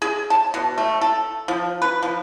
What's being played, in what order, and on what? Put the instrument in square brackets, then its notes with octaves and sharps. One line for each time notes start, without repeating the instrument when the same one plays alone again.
[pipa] G#4
A5
B2
A3
A4
F3
B4
F3